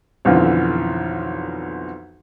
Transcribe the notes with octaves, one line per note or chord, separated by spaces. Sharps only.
B1 F2 D3 E3 F3